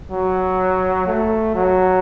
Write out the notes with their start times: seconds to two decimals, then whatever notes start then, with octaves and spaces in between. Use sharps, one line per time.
0.12 F#3
1.07 A3
1.55 F#3